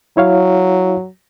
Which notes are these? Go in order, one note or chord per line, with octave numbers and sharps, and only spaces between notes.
F#3 E4 C#5 F5